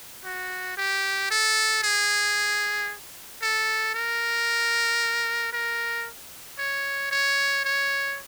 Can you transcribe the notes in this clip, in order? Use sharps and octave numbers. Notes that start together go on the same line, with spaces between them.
F#4
G4
A4
G#4
A4
A#4
A#4
C#5
C#5
C#5